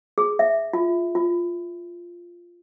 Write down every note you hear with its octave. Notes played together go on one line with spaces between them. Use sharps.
G#4
E5
F4
F4